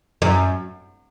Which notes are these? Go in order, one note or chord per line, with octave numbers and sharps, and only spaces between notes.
F#2